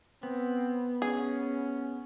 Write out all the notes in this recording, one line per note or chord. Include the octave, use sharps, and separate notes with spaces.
B3 C4
C#4 G#4